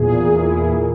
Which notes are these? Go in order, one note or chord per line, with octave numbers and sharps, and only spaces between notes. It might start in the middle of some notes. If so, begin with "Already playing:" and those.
Already playing: E2 A#2 G#4
A#3
A#3 E4
A#3
A#2